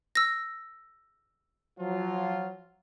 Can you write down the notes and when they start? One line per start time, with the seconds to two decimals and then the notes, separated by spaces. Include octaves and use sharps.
0.16 E6 A#6
1.79 F3 F#3 F4